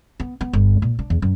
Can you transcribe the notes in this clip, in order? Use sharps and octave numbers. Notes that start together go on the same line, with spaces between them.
B3
B3
G1
A#2
D4
E2
F#2